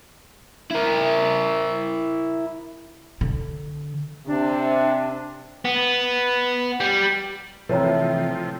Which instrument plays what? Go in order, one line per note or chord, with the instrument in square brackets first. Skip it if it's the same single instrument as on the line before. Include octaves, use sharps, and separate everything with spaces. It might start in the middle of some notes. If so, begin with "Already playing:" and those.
[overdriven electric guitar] E4 A#4
[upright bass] D3
[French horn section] C3 [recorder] D4
[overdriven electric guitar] B3
G3
[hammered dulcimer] A2 C4 [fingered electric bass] C3 E3 [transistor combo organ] F3 [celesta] B4 C#5 A#5